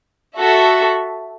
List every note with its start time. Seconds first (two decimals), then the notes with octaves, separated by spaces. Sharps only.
0.38 F#4 A4 E5